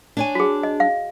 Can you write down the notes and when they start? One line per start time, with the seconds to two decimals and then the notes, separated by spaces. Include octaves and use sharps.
0.17 D4 C#5 G#5
0.35 F#4 G#4
0.63 D#5
0.80 F5